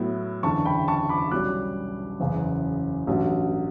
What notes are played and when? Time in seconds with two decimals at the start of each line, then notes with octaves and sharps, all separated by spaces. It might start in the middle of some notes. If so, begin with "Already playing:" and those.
Already playing: A2 F#3 B3 E4
0.43 F#1 E2 D3 A5 C#6
0.65 G5 B5
0.88 A5 C#6
1.09 B5 D6
1.31 B1 B2 G3 C#4 D6 F#6
2.20 F#1 E2 C#3
3.07 A1 G2 F#3